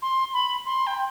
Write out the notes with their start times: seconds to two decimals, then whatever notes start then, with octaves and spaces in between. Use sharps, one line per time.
0.02 C6
0.34 B5
0.66 C6
0.87 G5